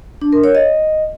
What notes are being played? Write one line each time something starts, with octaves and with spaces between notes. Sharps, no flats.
D4
A#4
C#5
D#5